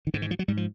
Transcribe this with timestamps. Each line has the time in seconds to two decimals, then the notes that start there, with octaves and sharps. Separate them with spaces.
0.07 D#3
0.14 G#2 D3
0.22 D#3
0.31 F3
0.39 F#3
0.48 G#2 G3
0.57 F3